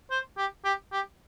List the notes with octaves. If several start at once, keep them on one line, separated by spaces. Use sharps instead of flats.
C5
G4
G4
G4